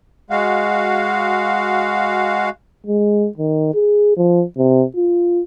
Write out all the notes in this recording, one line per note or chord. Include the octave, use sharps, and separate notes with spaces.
G#3 F#4 F5
G#3
D#3
G#4
F3
C3
F4